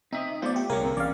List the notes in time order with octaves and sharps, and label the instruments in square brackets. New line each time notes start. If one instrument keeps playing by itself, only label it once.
[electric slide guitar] C4 E5 [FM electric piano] D#4 D#6
[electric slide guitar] A3 B3 C5 [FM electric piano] F4 D5
[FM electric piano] G4
[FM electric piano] C2 A#3 A#4 [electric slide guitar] G#4 C#5
[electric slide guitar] D3 C4
[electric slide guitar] E3 C#4 [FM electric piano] D5 F5